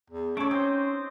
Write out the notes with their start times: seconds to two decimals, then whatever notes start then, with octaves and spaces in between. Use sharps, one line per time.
0.10 E2
0.37 A3 C#4 E4 C#5 D6
0.51 C4 D#4 C5